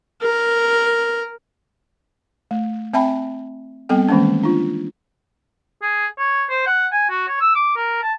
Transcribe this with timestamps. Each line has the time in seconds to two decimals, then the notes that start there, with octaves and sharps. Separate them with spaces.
0.22 A#4
2.51 A3
2.94 C4 E5 G5 A5 B5
3.89 G3 B3 C4 A4 G5
4.09 D#3 E3 G#3 A#3 C#4
4.44 D4 F4
5.82 G#4
6.18 C#5
6.50 C5
6.67 F#5
6.92 G#5
7.10 F#4
7.28 C#5
7.41 E6
7.55 D6
7.76 A#4
8.02 A5